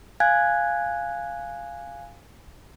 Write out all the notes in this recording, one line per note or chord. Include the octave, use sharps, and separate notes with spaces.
F5 G#5 F#6 G#6